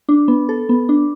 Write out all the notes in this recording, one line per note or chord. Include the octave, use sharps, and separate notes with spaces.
D4
B3
A4
B3
D4